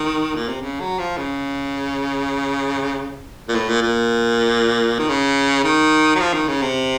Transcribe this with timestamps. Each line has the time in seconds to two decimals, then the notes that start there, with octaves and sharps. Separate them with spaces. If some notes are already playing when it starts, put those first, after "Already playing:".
Already playing: D#3
0.35 A#2
0.49 C3
0.62 C#3
0.80 F#3
0.99 F3
1.18 C#3
3.48 A#2
3.55 A2
3.69 A#2
3.82 A#2
4.99 D#3
5.09 C#3
5.64 D#3
6.15 F#3
6.20 F3
6.34 D#3
6.48 C#3
6.62 C3